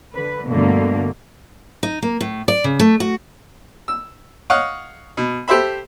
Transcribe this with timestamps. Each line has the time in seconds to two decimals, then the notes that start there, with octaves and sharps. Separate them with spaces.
0.15 D3 B4
0.48 G2 B2 D3 A3 A#3
1.83 D#4
2.02 A#3
2.21 A2
2.48 D5
2.64 C#3
2.79 A3
3.00 F#4
3.88 E6
4.50 C#5 D#5 F5 F#5
5.17 B2
5.48 G4 A4 C5 E5 B5